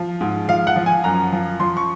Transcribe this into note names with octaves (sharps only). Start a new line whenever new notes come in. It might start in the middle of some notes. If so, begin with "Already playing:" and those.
Already playing: F3
G#2
F3 F5
F#5
F3
G#5
F#2 A#5
F3
F3 C6
C#6